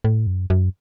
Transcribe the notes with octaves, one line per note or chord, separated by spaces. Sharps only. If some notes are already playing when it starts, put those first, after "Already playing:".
A2
F#2
F#2